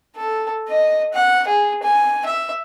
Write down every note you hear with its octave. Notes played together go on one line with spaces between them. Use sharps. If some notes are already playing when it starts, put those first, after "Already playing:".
A4
D#5
F#5
G#4
G#5
E5